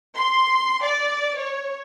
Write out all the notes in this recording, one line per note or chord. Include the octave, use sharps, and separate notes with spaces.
C6
D5
C#5